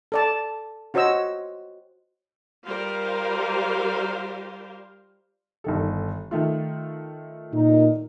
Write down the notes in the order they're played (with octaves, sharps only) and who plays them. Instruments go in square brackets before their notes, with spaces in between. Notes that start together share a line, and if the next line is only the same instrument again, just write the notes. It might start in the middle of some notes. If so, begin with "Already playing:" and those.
[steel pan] A4 D5 A5
F4 F#4 C5 C#5 D#5 E6
[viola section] G3 F4 A#4 C5 F5
[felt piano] G1 D#3 A4
D#3 A3 F4
[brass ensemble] A#2 D#4